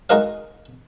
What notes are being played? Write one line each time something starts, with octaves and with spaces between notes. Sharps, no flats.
G#3 D#4 F#4 A#4 D#5 F5